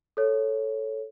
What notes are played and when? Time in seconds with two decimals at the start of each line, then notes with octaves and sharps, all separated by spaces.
0.17 A4 C#5